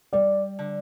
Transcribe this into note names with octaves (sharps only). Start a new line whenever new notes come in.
G3 D5
D3